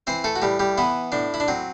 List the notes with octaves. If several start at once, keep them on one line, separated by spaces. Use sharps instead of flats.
E3 C4 C5
A3 A4
F#4
A2 G3 G4
G3 G4
E3 B3 E4
A2 D4
E4
D4
F#3 C4